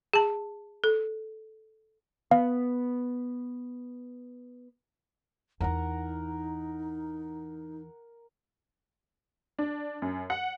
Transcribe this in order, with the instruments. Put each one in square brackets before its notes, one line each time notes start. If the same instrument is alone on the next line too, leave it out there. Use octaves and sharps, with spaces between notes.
[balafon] G#4 A5
A4
[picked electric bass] B3 [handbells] F5
[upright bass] E2 E3 [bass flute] D#4 [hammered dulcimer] A#4 F#5 A#5
[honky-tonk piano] D4
F#2
F#5